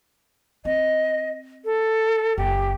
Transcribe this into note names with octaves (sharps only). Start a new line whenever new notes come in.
C4 D#5
A4
F#1 G4